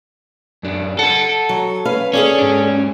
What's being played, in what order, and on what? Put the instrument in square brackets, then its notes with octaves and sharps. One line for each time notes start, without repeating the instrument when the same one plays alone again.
[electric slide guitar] F#2 D4
[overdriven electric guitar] A4 [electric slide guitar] F#5 A5
[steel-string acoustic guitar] F#3
C#4 B4 F5
[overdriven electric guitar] C#4 [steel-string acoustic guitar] G#4 A4 D5
[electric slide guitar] G#2 D4